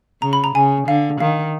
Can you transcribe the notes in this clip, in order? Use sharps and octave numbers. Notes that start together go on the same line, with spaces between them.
C#3 A#5
B5
A#5
C#3 G#5
D3 F5
D#3 F5